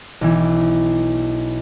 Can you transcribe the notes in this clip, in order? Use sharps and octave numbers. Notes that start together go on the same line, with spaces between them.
B1 E3